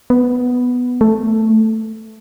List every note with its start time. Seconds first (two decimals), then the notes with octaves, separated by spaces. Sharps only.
0.10 B3
1.01 A3